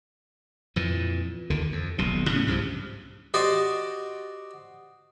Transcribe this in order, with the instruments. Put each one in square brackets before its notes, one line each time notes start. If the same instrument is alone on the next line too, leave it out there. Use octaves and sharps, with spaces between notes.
[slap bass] F2 A#2 E3
D#2 D3 D#3
F2
D#1 B1 B2
A2 C#3 C#4
C2 G2 C3 F3
[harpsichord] F#4 G4 C5 D5 D#5 F#5